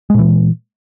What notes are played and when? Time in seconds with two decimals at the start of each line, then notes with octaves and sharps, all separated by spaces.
0.10 G#3
0.14 A#2
0.19 E3